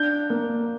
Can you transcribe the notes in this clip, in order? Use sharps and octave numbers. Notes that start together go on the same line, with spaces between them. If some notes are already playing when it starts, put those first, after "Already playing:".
Already playing: D4 G6
A#3